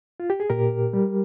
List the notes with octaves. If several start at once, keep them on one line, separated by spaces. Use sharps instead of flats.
F4
G4
G#4
A#2 G4 A#4
G3